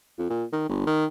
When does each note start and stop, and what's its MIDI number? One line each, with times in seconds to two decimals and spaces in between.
0.18 0.27 41
0.30 0.44 46
0.52 0.66 51
0.69 0.84 31
0.87 1.06 51